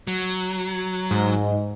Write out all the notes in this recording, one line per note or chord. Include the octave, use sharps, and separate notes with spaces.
F#3
G#2